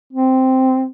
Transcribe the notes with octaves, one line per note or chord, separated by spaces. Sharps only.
C4